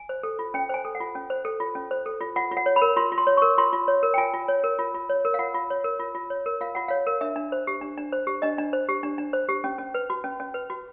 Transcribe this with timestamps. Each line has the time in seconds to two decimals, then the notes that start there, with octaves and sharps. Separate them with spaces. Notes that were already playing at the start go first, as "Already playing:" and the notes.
Already playing: G#5
0.09 C5
0.23 A4
0.39 F4
0.54 C#4 G5
0.69 C5 G#5
0.85 A4
0.95 F#5
1.00 F4
1.15 C#4
1.30 C5
1.45 A4
1.60 F4
1.75 C#4
1.91 C5
2.06 A4
2.20 F4
2.36 F4 F#5
2.52 F4
2.57 F#5
2.66 C#5
2.76 B5
2.82 A#4
2.96 F4 C6
3.12 F4
3.18 C6
3.27 C#5
3.37 A#4 C#6
3.58 F4 C6
3.73 F4
3.88 C#5
4.03 A#4
4.14 G5
4.18 F4 G#5
4.34 F4
4.48 C#5
4.64 A#4
4.79 F4
4.94 F4
5.09 C#5
5.25 A#4
5.34 F5
5.39 F4 F#5
5.55 F4
5.70 C#5
5.84 A#4
5.99 F4
6.15 F4
6.30 C#5
6.46 A#4
6.61 F4 F5
6.75 F4 F#5
6.88 C#5 F5
7.07 A#4
7.21 D4 E5
7.36 D4
7.52 C5
7.67 G4
7.81 D4
7.97 D4
8.12 C5
8.27 G4
8.42 D4 D#5
8.58 D4
8.73 C5
8.89 G4
9.03 D4
9.18 D4
9.33 C5
9.49 G4
9.64 C#4
9.78 C#4
9.94 B4
10.10 F#4
10.24 C#4
10.40 C#4
10.54 B4
10.70 F#4